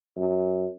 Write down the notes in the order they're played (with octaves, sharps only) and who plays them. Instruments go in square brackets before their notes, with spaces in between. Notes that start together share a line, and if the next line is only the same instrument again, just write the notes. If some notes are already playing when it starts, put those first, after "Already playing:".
[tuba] F#2